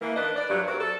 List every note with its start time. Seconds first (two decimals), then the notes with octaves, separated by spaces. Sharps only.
0.01 E3 A#3
0.16 D#3 D4 B4 D#5
0.36 D5
0.49 G2 F#3
0.67 C4 F#4 A#4 D5
0.80 A4